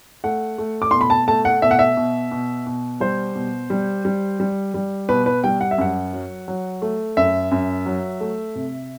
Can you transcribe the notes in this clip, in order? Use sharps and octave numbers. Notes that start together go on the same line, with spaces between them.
A3 F#5
A3
D6
B2 C6
B5
A5
A3 A5
F#5
B2 E5
F#5
E5
B2
B2
B2
G3 C5
B2
G3
G3
G3
G3
B2 B4
B4
G3 G5
F#5
E5
F#2 F#5
F#3
F#3
A3
F#2 E5
F#2
F#3
A3
C3